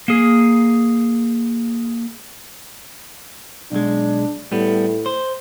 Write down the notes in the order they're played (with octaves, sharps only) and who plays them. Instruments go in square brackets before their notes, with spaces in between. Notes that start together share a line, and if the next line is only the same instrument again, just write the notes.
[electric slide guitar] A#3 G#4
[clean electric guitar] B1 G#3 [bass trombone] D4
[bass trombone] A2 [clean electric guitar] G3 B3
[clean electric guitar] C5